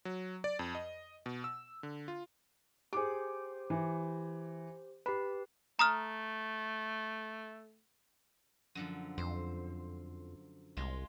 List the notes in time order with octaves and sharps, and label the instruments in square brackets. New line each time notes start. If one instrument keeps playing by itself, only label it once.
[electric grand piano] F#3
D5
F2
D#5
B2
E6
D3
F4
[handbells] G4 C5 [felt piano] G#4 D6
[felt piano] E3
[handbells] G4 B4 [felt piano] B5
[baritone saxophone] A3 [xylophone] A#5 D#6 F6
[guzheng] F#2 D3 F3
[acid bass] F2 [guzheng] C5
[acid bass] C2 [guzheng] G#3 F4